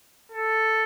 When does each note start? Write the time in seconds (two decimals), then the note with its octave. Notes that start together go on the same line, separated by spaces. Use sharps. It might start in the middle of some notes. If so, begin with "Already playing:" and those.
0.32 A4